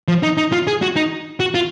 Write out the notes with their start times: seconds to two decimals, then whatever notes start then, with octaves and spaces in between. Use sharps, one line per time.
0.08 F3
0.23 D#4
0.37 D#4
0.52 F4
0.67 G#4
0.82 F#4
0.96 D#4
1.40 F#4
1.55 F4